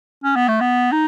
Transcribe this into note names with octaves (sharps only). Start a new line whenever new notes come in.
C#4
B3
A3
B3
D#4